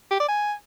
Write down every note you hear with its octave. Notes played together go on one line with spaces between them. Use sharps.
G4
D5
G#5